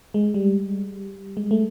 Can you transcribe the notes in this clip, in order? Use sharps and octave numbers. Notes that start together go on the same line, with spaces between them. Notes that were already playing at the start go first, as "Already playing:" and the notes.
G#3
G3
G#3
A3